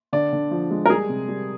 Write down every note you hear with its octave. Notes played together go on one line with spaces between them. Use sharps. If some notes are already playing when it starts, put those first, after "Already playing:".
D3 D5
D3
F3
G#3
A#4
G3 G#4
C3
G3